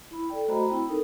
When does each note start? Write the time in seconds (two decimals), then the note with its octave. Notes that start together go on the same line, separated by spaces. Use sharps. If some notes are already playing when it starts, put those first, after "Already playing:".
0.11 E4 B5
0.30 A4 D5 G5
0.48 A3 F#4 C5 D#5 A#5 B5
0.68 C4 E4 G5 B5
0.89 D#4 A4 A#4